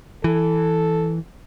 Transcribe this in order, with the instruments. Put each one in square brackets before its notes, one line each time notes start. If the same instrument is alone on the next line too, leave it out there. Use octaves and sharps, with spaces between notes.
[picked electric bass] E3 [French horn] A4